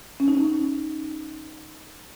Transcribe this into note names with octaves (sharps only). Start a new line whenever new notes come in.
C#4
D#4
C#4